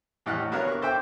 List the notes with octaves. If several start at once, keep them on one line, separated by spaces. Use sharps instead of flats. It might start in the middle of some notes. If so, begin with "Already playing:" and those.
E2 A2 G4 D#5 F#5 F6
B3 D4 F#4 A#4 C#5 F5
C#6 D6
A4 C5 E5 G5 D6